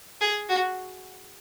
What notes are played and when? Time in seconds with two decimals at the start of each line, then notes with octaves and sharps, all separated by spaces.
0.21 G#4
0.49 F#4